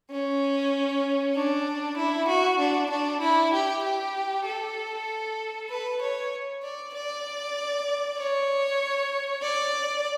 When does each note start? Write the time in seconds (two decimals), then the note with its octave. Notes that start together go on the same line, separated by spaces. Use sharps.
0.11 C#4
1.35 D4
1.97 E4
2.28 F#4
2.59 D4
2.90 D4
3.21 E4
3.53 G4
3.84 G4
4.46 A4
5.70 B4
6.01 C#5
6.63 D5
6.94 D5
8.18 C#5
9.43 D5